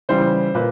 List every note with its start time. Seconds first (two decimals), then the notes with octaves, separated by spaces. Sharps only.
0.09 C#3 E3 G3 C5
0.55 A#2 B4